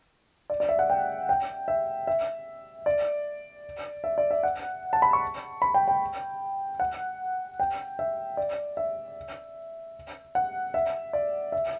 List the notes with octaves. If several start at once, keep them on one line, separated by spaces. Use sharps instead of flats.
D5
D5
E5
F#5
G5
G5
E5
E5
D5
E5
D5
E5
F#5
A5
B5
C#6
B5
G5
G5
F#5
G5
E5
D5
E5
F#5
E5
D5
E5